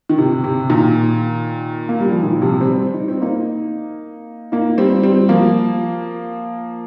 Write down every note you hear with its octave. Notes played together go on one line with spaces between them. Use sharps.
D#3
C3
C3
A#2 D#3
A#3
G3
F3
A#2 D#3
C3 F3
G3 C4
D#4
C4
A#3 D#4
A#3 D#4
G3 C4
G3 C4
F3 A#3